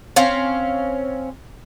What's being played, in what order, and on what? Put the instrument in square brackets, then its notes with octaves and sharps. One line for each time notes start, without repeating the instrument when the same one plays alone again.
[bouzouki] C4 C#4 F5